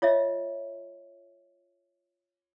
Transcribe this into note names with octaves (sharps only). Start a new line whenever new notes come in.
F4 C#5 D#5 E5